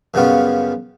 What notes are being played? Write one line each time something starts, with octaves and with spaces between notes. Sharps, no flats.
F#2 C#3 G3 B3 C#4 F4